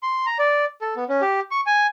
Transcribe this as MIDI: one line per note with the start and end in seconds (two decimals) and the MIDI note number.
0.03 0.26 84
0.26 0.38 82
0.39 0.65 74
0.81 0.94 69
0.96 1.04 59
1.09 1.21 61
1.21 1.40 67
1.51 1.61 85
1.66 1.87 80